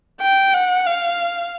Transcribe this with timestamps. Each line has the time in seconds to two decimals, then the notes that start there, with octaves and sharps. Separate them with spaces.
0.21 G5
0.54 F#5
0.86 F5